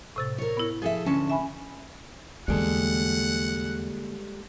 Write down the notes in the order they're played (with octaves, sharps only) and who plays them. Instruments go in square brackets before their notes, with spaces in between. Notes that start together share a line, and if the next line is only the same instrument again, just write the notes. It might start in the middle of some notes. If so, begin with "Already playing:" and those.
[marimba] A2 C3 A6
[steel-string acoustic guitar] A#4 C#5
[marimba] B3 E4
[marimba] F3 [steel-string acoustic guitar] G#4 A4 E5
[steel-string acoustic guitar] D2 C#4 A5
[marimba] E5 G#5 B5
[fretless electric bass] E2 [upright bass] D3 A#3 [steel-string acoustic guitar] G3 G#3 A4 [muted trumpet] F#5